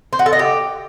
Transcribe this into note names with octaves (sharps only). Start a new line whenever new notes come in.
C5
F#4
A4
D#5
G4